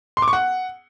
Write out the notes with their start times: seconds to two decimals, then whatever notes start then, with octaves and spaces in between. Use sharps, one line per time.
0.17 C6
0.22 D6
0.28 C#6
0.33 F#5